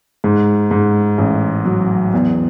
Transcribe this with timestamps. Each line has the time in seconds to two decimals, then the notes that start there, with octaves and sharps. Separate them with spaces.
0.24 G#2
0.71 G#2
1.18 A1
1.65 F#3
2.13 E2